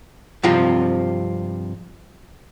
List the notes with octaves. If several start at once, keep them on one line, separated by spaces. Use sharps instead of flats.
G2 C3 F3 C4 F4